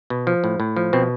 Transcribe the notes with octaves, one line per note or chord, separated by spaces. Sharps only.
B2
F3
A2
A2
F3
B2 C4